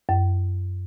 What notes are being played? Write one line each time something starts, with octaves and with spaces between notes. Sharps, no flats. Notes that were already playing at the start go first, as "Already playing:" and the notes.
F#2